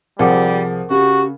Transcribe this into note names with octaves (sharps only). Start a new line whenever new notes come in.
C2 F3 G3 G#4 A#4 F#5 D6
C#3 F#4 G4